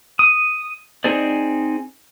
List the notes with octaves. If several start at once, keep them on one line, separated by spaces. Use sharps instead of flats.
D#6
C4 D#4 G#4 C5 D5